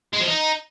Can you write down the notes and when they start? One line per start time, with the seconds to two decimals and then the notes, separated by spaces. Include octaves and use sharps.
0.13 G#3
0.20 F3
0.28 D#4